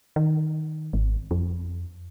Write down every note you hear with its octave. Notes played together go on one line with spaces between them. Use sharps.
D#3
G#1
F2